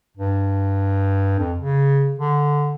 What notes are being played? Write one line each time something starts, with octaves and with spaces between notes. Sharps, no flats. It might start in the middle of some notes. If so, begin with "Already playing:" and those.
G2
F2
C#3
D3